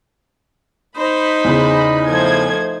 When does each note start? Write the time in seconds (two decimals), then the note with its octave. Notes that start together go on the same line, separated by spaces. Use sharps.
0.97 D#4 C5 B5
1.44 E2 C#3
2.08 F3 A3 C5 G#6